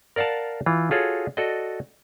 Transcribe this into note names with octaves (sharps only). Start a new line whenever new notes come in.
A#4 D5 F5 F#5 A5
E3 F4
F4 F#4 G#4 A4 C#5
F#4 A4 D5 D#5